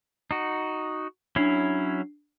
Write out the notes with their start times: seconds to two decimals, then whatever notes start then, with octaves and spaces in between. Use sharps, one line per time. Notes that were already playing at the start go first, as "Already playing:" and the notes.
0.31 D#4 F#4
1.36 F#3 C#4 D4 E4 C7